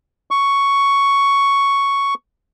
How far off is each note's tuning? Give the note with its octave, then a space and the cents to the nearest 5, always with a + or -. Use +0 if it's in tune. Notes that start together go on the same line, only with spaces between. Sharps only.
C#6 +5